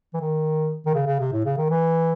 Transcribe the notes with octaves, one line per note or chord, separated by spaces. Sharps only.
E3
D#3
D#3
C#3
C#3
C3
A2
C#3
D#3
E3